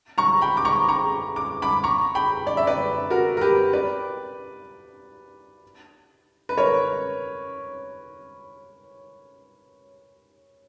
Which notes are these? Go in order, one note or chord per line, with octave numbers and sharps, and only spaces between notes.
A#5 C#6
G5 B5
D6
A#5 C#6
A#5 C#6
D6
B5 D6
A#5 C#6
G5 B5
D5
E5
B4 D5
F#4 A#4
A#4
G4 B4
B4 D5
B4
A#4 C#5